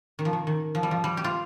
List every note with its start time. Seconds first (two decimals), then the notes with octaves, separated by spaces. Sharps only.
0.19 D#3
0.25 F3
0.33 D#3
0.47 D#3
0.75 F3
0.83 G3
0.91 F3
1.04 G3
1.17 G4
1.24 F4